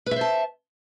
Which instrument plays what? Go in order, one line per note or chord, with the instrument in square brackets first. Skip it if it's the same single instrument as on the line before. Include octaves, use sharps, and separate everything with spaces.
[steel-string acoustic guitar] B4
E5
C5
A5